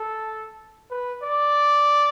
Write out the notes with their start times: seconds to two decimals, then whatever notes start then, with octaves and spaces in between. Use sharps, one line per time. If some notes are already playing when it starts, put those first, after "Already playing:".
Already playing: A4
0.91 B4
1.23 D5